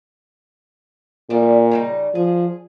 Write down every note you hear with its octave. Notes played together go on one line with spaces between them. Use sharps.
A#2 F3 G3 A3
C#3 G3 D#4
F3 G#4